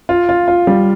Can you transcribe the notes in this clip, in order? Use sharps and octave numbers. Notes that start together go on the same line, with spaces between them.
F4
F4
F4
G3